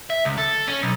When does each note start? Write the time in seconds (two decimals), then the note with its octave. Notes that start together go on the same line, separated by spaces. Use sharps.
0.10 E5
0.25 C#2
0.38 A4
0.68 C#4
0.82 B1